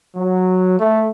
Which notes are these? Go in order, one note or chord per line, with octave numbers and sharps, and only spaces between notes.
F#3
A3